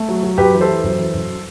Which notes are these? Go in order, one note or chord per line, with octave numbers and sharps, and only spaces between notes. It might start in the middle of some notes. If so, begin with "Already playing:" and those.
Already playing: A3
F#3
F#3
F#2 G4 B4
E3
A4 C5
E3
F#2
E3
F#2